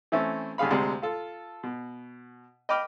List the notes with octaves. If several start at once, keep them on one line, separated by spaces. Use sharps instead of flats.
E3 A3 C4 C#4 E4
D#2 D3 G#4 F5 B5
D2 C3 G#3 C4
F4 A4
B2
D#5 G5 B5 D6 F6